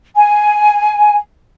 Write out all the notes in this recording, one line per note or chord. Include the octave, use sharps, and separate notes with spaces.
G#5